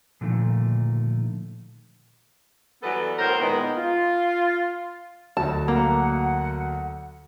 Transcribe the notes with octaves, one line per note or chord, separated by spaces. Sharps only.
A#2 D3 D#3 F3 A3
E3 F#3 G3 B3 A4 B4
A2 A#4 C5
A#2 D#3 G#3 A#3 B3
F4
D2 F#3 A5
A#3 F#5